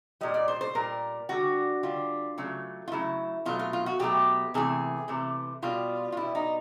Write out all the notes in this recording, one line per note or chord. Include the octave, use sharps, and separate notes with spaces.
A#2 G3 D#5
D5
C5
C5
A#2 G3 A#4
D3 G3 F#4
D3 G3 F4
C#3 F#3 A3
F4
C#3 F#3 A3 E4
B2 F#3 A3 F4
F4
F4
F#4
B2 F#3 A3 G4
C3 E3 A3 G#4
C3 E3 A3
B2 G3 F4
F4
B2 G3 E4
D#4